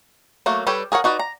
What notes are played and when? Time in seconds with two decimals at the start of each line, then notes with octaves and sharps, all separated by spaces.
0.46 F#3 A3 A#3 F#4
0.67 G3 A4 B4 C#5 G5
0.92 G#4 A#4 C#5 F#5
1.04 D#4 F#4 B4 D5
1.19 A#5